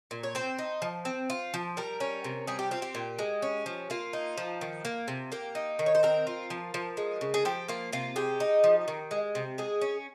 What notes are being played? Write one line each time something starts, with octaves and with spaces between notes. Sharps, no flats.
A#2
C#5
C4 C5
D#4
F3
C4
F4
F3
G3 A#4
C#4
C3
G3 G#4
G4
C4 F4
G4
A#2
G#3
C#4
F3
A#3 F4
D#4
F3
D#3
A#3
C3
A#3 G4
D#4
D#3
C#5
C5
C4 A#4
F4
F3
F3
G#3
C#3
G#4
F3 G4
A#3 F4
C3 F4
G#3 G4
D#4
F3
D#3
G#3
C3
G#3 G#4
C#4